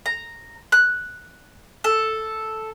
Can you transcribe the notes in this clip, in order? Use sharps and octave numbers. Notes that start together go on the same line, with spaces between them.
A#5
F#6
A4